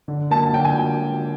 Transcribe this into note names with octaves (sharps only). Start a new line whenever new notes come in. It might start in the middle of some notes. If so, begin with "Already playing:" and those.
D3
F#3 A#3 A5
D3 G5
G#5